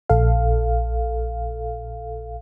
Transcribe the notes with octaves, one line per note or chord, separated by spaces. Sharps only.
A#1 A4 F5